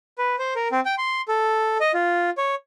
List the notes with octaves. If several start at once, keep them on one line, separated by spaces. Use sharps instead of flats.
B4
C5
A#4
C4
G5
C6
A4
D#5
F4
C#5